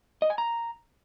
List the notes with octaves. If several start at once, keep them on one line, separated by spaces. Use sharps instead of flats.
D#5
G#5
A#5